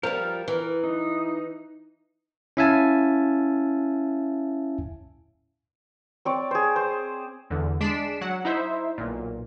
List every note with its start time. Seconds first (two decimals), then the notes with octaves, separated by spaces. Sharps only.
0.03 F3 G3 A#4
0.48 E3
0.84 D#4
2.57 C#4 E4 E5 F5 G#5 A5
6.25 C4 C#5 D5
6.51 G#4 C5
6.76 C5
7.50 E2 D3
7.81 G#3 D4 B6 C7 D7 E7
8.21 F#3 F#5
8.45 D#4 E4 C5 E5
8.98 B1 A#2